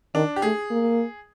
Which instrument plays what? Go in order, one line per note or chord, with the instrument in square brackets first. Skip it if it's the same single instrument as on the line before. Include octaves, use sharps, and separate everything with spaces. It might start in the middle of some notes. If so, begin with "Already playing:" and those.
[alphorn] D#3 [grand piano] D4
[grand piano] G4
[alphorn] A3 [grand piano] G#4
[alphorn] A#3